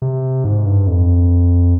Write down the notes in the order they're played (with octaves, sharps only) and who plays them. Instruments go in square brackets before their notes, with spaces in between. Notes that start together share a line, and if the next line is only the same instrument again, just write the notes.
[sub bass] C3
G#2
G2
F2